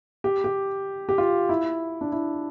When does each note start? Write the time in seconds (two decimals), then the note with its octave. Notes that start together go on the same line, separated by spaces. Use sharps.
0.24 G4
0.44 G4
1.09 G4
1.18 F4
1.49 E4
2.01 D4
2.12 E4